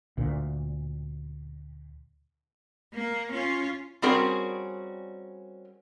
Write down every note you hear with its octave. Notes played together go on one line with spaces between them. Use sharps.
D2 A#2
A#3
C#4 F4
G3 C4 C#4 F#4 G#4 A#4